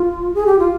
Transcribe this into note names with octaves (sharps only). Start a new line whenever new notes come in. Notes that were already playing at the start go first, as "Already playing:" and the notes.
Already playing: F4
G#4
G4
F4